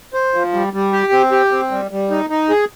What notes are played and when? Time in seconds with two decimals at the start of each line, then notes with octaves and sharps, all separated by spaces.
0.14 C5
0.34 F3
0.53 G3
0.73 G3
0.93 G4
1.12 C4
1.31 G4
1.51 C4
1.71 G3
1.91 G3
2.11 D#4
2.30 D#4
2.50 G#4